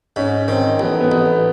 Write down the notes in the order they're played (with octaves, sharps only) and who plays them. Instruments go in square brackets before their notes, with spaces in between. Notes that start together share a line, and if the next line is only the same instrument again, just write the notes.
[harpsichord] G#2 [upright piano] C#4
[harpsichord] D#3 [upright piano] C4
[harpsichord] A1 [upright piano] B3
[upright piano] B3
[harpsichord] A1 [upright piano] B3